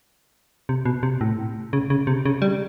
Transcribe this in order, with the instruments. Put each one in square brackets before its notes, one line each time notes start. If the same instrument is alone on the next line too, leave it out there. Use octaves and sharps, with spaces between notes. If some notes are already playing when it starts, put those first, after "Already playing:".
[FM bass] C3
B2
C3
A2
C#3
C#3
C3
C#3
G3